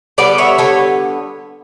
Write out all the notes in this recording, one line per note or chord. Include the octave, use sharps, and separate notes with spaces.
D3 G3 B3 B4 D5
C#5 E5
A4 C#5